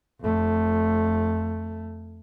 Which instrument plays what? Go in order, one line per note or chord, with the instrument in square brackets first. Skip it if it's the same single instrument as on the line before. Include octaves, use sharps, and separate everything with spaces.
[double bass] F2 A3